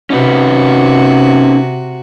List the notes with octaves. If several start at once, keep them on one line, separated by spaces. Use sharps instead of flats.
C3 C#4 D#4 F#4 B4